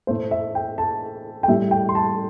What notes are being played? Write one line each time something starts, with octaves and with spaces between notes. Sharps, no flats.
A2 A3 C5
E5
G5
A5
G5
A2 G3 E5
G5
C6
A5